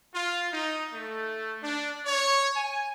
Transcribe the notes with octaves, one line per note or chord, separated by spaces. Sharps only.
F4
D#4
A3
D4
C#5
G#5